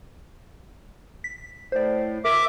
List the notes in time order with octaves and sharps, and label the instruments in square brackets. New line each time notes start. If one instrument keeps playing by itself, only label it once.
[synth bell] B6
[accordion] A2 [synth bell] C5 D5
[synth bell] A#4 [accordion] E5 D6